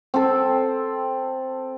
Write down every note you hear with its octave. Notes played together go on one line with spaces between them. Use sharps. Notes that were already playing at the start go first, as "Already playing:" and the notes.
C4 A4